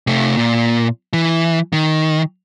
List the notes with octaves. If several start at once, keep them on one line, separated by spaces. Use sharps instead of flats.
C3 A3
A#2
E3
D#3